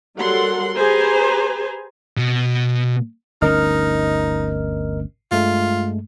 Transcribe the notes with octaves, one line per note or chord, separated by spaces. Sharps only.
F#3 G3 A4 A#4 F#5 C6
G4 G#4 B4 C5 G#5 A#5
B2
G1 D2 C#4 D#4 A#4 D#5 F6
G2 G#3 A3 F4